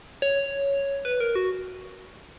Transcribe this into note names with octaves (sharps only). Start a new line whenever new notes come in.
C#5
B4
A#4
F#4